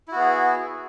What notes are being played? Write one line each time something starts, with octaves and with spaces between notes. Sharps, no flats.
B3 E4 F#4 G#4